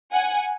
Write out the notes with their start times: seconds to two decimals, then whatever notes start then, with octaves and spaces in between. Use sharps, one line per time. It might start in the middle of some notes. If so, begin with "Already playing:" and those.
0.13 F#5 G#5